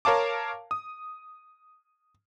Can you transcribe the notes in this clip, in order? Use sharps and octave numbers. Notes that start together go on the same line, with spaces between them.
A#4 C#5 F5 A5 D6
D#6